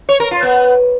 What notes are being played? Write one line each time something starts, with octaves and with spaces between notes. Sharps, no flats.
C#5
A#4
F4
B3